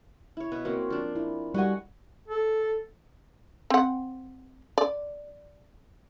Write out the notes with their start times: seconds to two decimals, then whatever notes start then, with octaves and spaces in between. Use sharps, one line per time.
0.37 E4 C#5
0.52 B2 F#4 B4
0.65 F#3 A#3 C4
0.90 F3 D4
1.16 E4
1.54 G3 F#4 D#5 F#5 G#5
2.28 A4
3.70 C4 F#5
4.78 D5